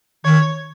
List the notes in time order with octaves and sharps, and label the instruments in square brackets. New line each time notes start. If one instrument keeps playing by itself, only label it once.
[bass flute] D#3 [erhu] C#5